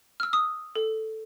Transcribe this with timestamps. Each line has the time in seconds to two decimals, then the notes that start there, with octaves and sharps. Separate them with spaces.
0.20 E6 F6
0.33 D#6
0.76 A4